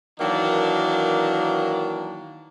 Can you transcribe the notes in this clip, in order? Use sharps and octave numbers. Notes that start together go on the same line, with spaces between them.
D#3 E3 F#3 A#3 D4